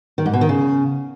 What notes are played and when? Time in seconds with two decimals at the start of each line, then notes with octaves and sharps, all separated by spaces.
0.18 D#3
0.26 G#2
0.33 B2
0.41 D#3
0.49 C#3